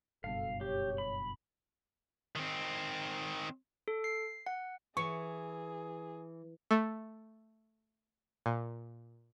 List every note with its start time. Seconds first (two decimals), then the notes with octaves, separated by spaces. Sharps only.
0.24 F#1 G2 B2 A4 F5
0.61 G4 C#5
0.98 B5
2.36 D#3 C4
3.88 A4
4.04 C7
4.46 F#5
4.97 E3 G#4 C#6
6.71 A3
8.46 A#2